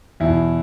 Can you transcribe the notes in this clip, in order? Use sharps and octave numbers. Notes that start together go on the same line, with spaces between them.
E2 B2 E4